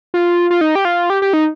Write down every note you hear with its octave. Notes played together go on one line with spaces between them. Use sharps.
F4
F4
D#4
G4
F4
G4
G4
D#4